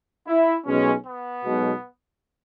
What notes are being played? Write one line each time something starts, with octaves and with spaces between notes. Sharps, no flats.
E4
B1 B2 G#3 C#4
B3
B1 B2 G#3